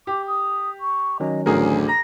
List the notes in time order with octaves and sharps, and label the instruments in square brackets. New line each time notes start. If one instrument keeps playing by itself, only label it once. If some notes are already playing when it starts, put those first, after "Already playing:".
[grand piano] G4 [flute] D6
[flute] D#6
C#6
[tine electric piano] D#3 F#3 C#4 [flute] D#5
[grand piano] A1 G#4 A#4 [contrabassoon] D2 [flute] G#5
[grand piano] A#5 [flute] A#6